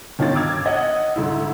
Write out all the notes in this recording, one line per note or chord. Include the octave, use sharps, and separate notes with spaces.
G1 D#3 C#4 F4 A6
D6 E6 F6 G#6 A6
D#5 F#5
D2 G#2 E4